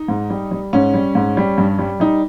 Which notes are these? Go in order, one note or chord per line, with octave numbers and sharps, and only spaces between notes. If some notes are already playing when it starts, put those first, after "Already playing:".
Already playing: D#4
G#2
G3
G3
G#2 C#4
G3
G#2
G3
G2
G3
G3 D#4